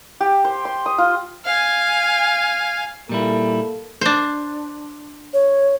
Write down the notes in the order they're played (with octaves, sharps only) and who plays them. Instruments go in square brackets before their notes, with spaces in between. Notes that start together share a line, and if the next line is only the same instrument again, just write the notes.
[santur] G4
C5
C6
D#6
F4
[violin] F5 G#5
[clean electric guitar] A#2 G3 E4 [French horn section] A#3 A4
[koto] D4 C5
[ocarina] C#5